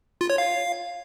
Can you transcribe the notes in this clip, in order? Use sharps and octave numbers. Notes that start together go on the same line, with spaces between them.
F4
C#5
F5